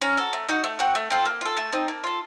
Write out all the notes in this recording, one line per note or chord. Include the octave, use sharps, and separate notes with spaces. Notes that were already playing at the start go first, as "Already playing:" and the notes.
C#4 A#5
F#4 A4
A3
D#4 F#4
A3
C4 F#4 F#5
A3
C4 F4 A4
A#3
F4 A4
A3 A5
C4 D#4
A#3
F4 A4